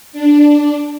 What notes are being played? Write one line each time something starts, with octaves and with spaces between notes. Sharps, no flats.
D4